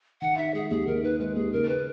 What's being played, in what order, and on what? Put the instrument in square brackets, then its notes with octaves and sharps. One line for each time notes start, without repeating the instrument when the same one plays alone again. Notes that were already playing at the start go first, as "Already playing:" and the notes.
[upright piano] D#3 [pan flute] F#5
[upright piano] D#4 [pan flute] E5
[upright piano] G#3 [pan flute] G#4
[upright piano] D#2 [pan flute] G#4
[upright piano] D#3 [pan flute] A#4
[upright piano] D#4 [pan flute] B4
[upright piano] G#3 [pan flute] B4
[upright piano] D#2 [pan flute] G#4
[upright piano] C#3 [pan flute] A#4
[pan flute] B4